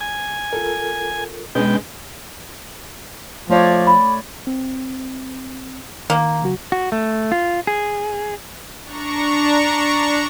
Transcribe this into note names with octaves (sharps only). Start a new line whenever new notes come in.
G#5
F4 A4 A#4
B2 G#3 C#4 D4 B4 G5
F3 A3 C#5 D5
B5
C4
D#3 A#3
C#3 F#3 F#4
F#4
A3
F4
G#4
D4 A#5 C#6